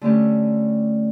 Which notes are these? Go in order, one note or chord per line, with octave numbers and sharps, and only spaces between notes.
D3 A3 C#4 G4